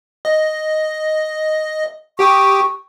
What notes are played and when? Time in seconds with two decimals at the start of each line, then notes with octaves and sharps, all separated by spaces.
0.25 D#5
2.19 G4 G5 C#6 D#6